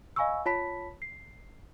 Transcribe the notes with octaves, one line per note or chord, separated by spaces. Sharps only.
D#5 F5 G#5 B5 C#6 E6
F4 C#5 A5 B5 B6
C7